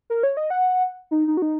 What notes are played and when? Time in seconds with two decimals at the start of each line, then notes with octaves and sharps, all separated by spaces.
0.10 A#4
0.23 C#5
0.37 D#5
0.50 F#5
1.11 D#4
1.28 D#4
1.37 F#4
1.42 D#4